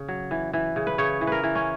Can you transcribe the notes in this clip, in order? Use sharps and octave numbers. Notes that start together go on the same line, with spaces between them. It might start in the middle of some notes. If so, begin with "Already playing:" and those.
Already playing: C#3
F#3
E3
E3
C#3
B4
C#3 C#5
E3
A#4 B4
E3
C#4